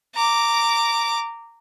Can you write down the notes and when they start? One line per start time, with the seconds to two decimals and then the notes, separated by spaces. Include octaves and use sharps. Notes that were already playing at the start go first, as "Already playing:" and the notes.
0.15 A#5 D6